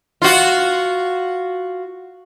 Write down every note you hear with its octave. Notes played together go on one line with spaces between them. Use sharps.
F4 F#4